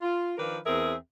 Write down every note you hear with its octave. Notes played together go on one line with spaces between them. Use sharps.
F4
D#3 F3 D4 A#4 B4
E2 C4 G#4 A#4 E5